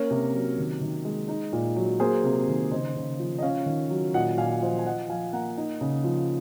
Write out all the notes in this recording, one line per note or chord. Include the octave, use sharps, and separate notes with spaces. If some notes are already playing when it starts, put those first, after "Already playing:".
Already playing: A#3 C#4 A#4 C#5
C3
F#3
D#3
D#3
G#3
D#4
A#2
F#3
A#3 G#4 C5
C3
D#3
C#3 C5 D#5
C#3
F3
D#5
C#4 C#5 F5
D#3
F#3
A#2 D#5 F#5
A#2 F5 G#5
F3 C5 D#5
G#5
F3 D#5 F#5
F3 F5 G#5
A#3 F#5 A#5
D#4
C#3
F3